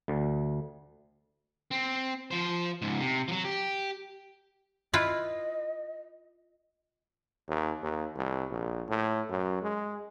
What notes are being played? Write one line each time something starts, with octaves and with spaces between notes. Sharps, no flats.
D2
C4
F3 C5
C#2 G#2
C3
F3 F#3
G4
E4 F4 B4 D#5
D#2
D#2
C2
A#1
A2
F#2
G#3